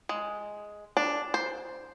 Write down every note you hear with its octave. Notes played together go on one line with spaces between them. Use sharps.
G#3
D4
C5